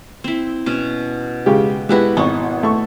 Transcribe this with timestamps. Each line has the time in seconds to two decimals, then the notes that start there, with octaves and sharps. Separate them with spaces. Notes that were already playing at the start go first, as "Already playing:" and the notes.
0.24 C4 E4
0.66 B2 C#4
1.46 C#3 G#3 G4
1.89 G#3 B3 E4 F#4 G4 B4
2.17 G#1 B3 C#6
2.63 A3 C#6